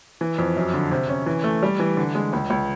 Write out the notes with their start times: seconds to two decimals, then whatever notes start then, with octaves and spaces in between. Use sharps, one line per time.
0.21 E3
0.38 F2
0.56 F#2
0.74 D3
0.91 C3
1.09 C#4
1.26 E3
1.44 A3
1.63 G3
1.79 E3
1.97 D3
2.15 G#3
2.33 C#2
2.50 C#2